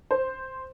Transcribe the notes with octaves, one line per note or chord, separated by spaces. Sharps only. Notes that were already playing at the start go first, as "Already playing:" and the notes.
C5